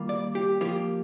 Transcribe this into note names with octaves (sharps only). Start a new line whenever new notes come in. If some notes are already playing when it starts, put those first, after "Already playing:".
Already playing: D#3 G3 A#3 F4
D5
G4
F3 A#3 F4 G4